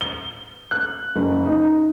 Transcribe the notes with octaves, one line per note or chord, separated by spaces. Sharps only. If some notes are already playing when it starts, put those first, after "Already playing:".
G7
F#6
F#1
D#4